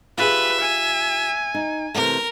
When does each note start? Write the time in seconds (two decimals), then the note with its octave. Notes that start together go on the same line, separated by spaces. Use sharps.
0.18 F4 G4 G#4 B4 E5
0.60 G#5
1.54 D#4
1.95 C3 E3 A3 A#4